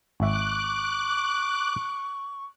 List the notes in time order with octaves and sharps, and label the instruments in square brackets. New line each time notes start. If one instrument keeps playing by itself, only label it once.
[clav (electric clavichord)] G#1 E5 [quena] C#6 [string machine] D6 F#6